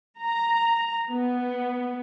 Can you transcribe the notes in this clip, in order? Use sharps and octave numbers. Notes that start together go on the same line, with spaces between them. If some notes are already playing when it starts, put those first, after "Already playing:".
A#5
B3